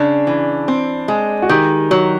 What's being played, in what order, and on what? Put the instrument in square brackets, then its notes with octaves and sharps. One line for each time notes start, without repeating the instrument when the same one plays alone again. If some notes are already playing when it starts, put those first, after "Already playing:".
Already playing: [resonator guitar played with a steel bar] C#3 [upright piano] D4
[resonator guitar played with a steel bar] E3
C4
G#3
[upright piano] F#4
[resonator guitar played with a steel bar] D#3 [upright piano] G4
[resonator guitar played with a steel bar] F#3